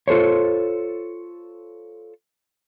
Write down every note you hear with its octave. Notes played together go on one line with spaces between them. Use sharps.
F4 A4 C5 C#5